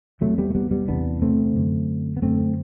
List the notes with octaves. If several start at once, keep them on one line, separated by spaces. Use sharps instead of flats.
E2 C3 F#3 A3
G3 B3
A3
G3 B3
G3 B3
E2 C3 B3 D4
A3 C4
F#2 D3
B3
F#2 D3 A3 C4